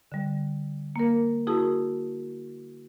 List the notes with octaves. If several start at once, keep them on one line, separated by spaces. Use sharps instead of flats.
D3 G3
A#3 A#4
E4 F#4 G#4 A#4 A5 D#6